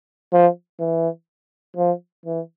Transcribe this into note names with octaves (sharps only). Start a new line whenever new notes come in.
F3
E3
F3
E3